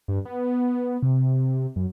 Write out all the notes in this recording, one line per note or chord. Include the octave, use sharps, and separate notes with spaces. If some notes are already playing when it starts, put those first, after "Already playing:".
G2
B3
C3
F#2